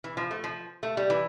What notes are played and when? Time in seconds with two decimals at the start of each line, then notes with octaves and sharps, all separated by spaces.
0.04 E3
0.17 F3
0.31 A3
0.44 F3
0.83 A3
0.97 G3
1.10 E3